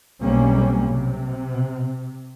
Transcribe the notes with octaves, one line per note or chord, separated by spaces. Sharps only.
B1 C3 G3 A#3 C#4
C3